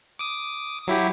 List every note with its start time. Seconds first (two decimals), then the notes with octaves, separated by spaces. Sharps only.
0.19 D6 D#6
0.87 F#3 E4 G4